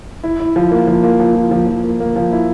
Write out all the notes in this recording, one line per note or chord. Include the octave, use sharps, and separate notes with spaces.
E4
E4
F3
A#3
F3
A#3
F3
F3
F3
F3
A#3
A#3
F3
E4